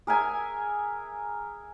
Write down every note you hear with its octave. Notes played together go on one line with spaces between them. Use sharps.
G#4 A#4 E5 G#5